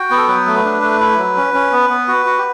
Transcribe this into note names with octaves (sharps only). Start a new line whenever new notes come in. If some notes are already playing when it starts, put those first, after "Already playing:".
Already playing: F#4 G5
B3
A4
F#3 B4
A3
D4
A3
E4
F#3
C#4
C#4
B3
B3
F#4
F#4
G4